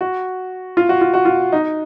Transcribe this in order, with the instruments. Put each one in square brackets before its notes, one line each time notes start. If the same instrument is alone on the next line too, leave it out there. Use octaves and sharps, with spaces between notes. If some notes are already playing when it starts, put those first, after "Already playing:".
[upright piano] F#4
F4
F#4
F4
F#4
F4
D#4